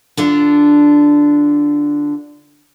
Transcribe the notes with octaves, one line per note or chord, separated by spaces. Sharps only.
D3 D4 F4